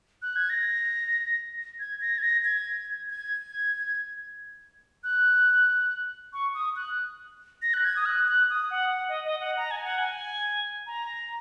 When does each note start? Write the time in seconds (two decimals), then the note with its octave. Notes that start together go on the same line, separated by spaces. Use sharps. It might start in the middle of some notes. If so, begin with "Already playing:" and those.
0.22 F#6
0.36 G#6
0.50 A#6
1.80 G#6
2.01 A#6
2.18 G#6
2.23 A#6
2.45 G#6
3.09 G#6
5.04 F#6
6.33 C#6
6.54 D#6
6.76 F#6
7.62 A#6
7.74 F#6
7.85 G#6
7.96 D#6
8.06 F#6
8.28 F#6
8.50 D#6
8.70 F#5
8.92 F#5
9.09 D#5
9.25 D#5
9.40 F#5
9.57 A#5
9.71 G#5
9.84 F#5
9.98 G#5
10.87 A#5